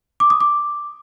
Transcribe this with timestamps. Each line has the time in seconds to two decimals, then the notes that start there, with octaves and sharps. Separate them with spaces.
0.20 D6
0.30 D#6
0.40 D6